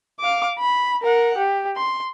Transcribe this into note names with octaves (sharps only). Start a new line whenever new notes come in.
F5 D6
B5
A#4 F#5
G4
C6